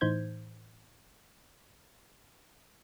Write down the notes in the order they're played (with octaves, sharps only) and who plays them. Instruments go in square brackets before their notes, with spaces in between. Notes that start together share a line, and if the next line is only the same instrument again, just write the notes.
[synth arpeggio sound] A2 E3 D#4 C5 G6 G#6